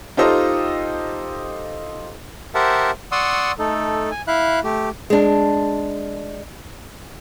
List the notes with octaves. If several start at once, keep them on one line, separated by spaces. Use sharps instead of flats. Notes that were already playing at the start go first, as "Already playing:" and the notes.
D#4 F4 G4 A4 C5 D#5
G4 A#4 C5 E5 F#5 A5
D5 F#5 C6 C#6 D#6 E6
A3 D#4 A4
G#5
E4 E5 F5 F#6
A3 G4
G#3 D4